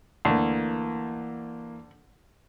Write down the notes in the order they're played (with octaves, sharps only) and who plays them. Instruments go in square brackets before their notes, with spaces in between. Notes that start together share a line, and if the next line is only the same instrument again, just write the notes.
[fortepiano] D2 [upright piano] E3 A#3